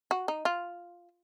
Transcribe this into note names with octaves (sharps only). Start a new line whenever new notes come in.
F#4
D#4
F4